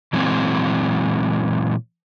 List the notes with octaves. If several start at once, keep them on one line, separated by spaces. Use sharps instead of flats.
A#2 E3 F#3 G#3 C4